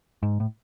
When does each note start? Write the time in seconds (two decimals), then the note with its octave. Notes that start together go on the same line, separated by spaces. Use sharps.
0.23 G#2
0.40 A2